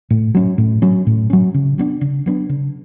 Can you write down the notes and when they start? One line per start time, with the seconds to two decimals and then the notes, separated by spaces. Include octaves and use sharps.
0.10 A2
0.35 F#3 C#4
0.58 A2
0.82 F#3 C#4
1.07 A2
1.30 F#3 C#4
1.54 C#3
1.78 F#3 B3 D4
2.01 C#3
2.26 F#3 B3 D4
2.49 C#3